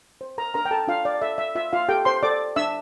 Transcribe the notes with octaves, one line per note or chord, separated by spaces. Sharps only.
C5
A#4 A#5
D4 A#4 A#5
G5
A4 A5
D4 F4 F5
D5
A4 E5
E5
F4 E5
F4 F5
G4 A4 G5
C5 C6
A4 D5 D6
D4 E5 E6